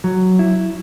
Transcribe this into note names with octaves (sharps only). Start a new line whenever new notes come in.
F#3
E4